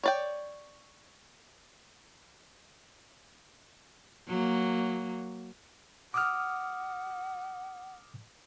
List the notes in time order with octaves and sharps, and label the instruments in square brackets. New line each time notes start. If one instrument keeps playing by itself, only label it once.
[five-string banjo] C#5 D5 G5
[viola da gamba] F#3 A#3
[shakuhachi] F#5 [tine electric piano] D6 D#6 F6